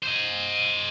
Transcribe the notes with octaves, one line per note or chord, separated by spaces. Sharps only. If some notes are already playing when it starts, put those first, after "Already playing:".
C5 D#5